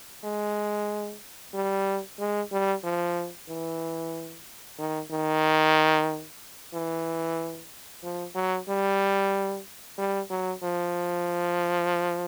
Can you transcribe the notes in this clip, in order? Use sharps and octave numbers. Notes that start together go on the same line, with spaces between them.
G#3
G3
G#3
G3
F3
E3
D#3
D#3
E3
F3
F#3
G3
G3
F#3
F3